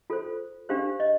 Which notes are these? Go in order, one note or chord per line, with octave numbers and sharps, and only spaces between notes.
F4 A4 C5
D4 G4 C5 F5
D#5